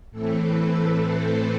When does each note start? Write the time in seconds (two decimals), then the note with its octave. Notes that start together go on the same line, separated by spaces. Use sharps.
0.11 A2 E3 A3 C4 A4
0.43 B4
0.73 A4
1.04 C5